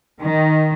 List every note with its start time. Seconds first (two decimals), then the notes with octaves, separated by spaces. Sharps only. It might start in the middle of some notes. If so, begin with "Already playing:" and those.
0.21 D#3